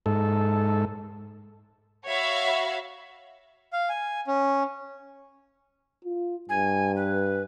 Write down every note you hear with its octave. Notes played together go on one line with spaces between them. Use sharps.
G#2 A4
F#4 C#5 E5 F5 B5
F5
G#5
C#4
F4
G2 G#5
B4